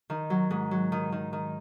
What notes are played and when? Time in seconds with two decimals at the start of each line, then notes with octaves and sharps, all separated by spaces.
0.10 D#3
0.30 F#3
0.51 G#2
0.71 F#3
0.92 D#3
1.12 D#3
1.33 D#3